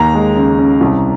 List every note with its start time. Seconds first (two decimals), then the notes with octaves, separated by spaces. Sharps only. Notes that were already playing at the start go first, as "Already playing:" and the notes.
Already playing: D#2 A#5
0.14 G#3
0.36 C#3
0.59 C#4
0.81 C2